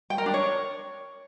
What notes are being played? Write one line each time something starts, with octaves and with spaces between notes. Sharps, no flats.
G5
A#4
D4
C#5